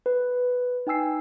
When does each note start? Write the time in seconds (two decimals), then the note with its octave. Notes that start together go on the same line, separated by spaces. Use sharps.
0.06 B4
0.87 D#4 G5 G#5 E6 C7